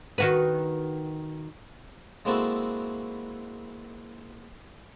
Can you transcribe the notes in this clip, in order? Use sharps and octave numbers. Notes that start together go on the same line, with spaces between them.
D#3 F#4 B4
G#3 A#3 C4 E4 F#4 A4